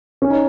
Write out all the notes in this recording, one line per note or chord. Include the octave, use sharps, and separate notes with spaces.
C#4
D#4